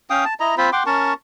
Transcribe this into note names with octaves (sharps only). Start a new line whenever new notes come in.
C#4 F5 G5 D#6
A5
E4 D#5 A#5
C4 F4 C5 B5
F#5 G5 C6 D6
C#4 A#4 A5 C#6